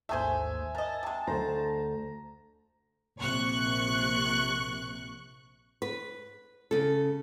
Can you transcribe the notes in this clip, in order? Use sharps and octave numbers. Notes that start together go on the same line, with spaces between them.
A1 D#2 G#2 A3 G#4 C5 E5 G#5
A#4 D#5 A5
C3 G#3
D2 C5 A#5
A#1 C3 C#6 F#6
B4
C#3 A4